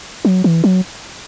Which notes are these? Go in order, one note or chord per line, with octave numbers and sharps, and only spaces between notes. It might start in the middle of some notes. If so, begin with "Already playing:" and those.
F#3
E3
F#3